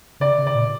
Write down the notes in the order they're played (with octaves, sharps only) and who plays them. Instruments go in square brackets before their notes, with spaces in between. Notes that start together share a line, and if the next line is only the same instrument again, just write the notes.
[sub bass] C#3 [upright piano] D5
[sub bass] C#3
[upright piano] D5
[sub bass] A#2